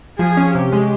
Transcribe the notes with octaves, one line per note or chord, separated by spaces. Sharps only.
F3 G#4
C#4
C3 G4
G#3